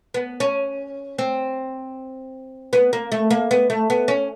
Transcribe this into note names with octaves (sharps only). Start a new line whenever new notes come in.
B3
C#4
C4
B3
A#3
A3
A#3
B3
A3
B3
C#4